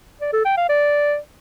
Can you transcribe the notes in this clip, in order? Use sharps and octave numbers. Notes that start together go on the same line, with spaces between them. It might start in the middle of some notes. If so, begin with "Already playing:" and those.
D5
A4
G5
F5
D5